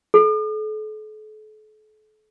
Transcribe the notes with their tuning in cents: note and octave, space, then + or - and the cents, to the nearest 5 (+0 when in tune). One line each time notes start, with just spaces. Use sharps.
A4 -40